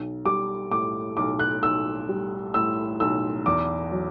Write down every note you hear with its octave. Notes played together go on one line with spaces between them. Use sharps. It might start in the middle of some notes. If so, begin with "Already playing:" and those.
Already playing: B1
G3 D6
A2 D6
B1 D6
F#6
B1 E6
G3
A2 E6
B1 E6
E2 D6
F#3